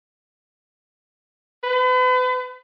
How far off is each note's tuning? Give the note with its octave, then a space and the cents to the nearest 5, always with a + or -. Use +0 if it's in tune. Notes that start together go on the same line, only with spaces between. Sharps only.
B4 +40